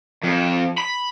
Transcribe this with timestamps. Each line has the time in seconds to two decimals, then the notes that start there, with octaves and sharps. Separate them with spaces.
0.24 F2
0.78 B5